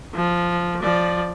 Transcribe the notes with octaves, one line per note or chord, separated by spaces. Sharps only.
F3
F3 D5